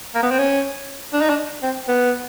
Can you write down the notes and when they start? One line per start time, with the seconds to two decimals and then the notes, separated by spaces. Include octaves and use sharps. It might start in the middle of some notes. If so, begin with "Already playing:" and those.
0.15 A#3
0.23 B3
0.31 C4
0.39 C#4
1.13 D4
1.21 D#4
1.29 D4
1.63 C4
1.88 B3